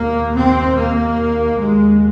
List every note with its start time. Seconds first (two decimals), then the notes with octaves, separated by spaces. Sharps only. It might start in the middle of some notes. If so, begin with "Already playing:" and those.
Already playing: D#2 A#3
0.34 C4
0.76 A#3
1.59 D#2 G#3